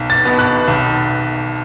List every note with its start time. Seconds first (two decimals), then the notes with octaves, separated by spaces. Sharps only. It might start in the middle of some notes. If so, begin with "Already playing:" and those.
Already playing: B1
0.10 A6
0.25 B2 B3
0.39 F#6
0.68 B1